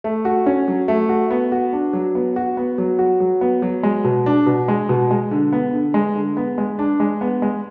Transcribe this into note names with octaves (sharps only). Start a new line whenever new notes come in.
A3
F#4
C#4
F#3
A3
F#4
B3
F#4
D4
F#3
B3
F#4
B3
F#3
F#4
F#3
B3
F#3
G#3
B2
D4
B2
G#3
B2
G#3
D3
B3
D3
G#3
D3
B3
G#3
D4
G#3
B3
G#3